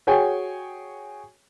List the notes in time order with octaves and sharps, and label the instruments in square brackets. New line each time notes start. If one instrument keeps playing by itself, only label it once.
[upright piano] F#4 G#4 C#5 G5 G#5